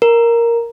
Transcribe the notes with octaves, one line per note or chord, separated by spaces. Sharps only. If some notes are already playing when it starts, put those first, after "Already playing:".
A#4